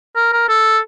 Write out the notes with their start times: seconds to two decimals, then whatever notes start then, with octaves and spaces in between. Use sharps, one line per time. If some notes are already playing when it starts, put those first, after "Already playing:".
0.16 A#4
0.33 A#4
0.49 A4